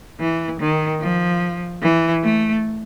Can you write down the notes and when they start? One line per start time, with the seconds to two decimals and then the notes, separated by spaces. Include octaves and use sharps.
0.20 E3
0.60 D#3
1.01 F3
1.82 E3
2.23 A3